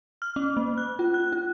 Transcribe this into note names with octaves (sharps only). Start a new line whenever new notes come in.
F6
C#4
A#3
F#6
F4
F#6
F4